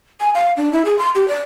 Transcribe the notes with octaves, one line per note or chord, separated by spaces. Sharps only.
G#5
F5
D4
E4
G#4
C6
G4
D5